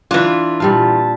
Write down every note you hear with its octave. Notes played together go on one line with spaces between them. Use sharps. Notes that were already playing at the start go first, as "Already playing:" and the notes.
E3 D4 F4 B4
A#2 G3 F5 A5